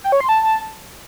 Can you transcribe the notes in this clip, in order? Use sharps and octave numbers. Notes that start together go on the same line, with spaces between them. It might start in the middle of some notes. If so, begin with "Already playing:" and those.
G5
C#5
C6
A5